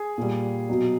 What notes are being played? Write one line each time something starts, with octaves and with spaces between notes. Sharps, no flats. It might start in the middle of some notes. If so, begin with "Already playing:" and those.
Already playing: G#4
A#2 G3
B2 F#3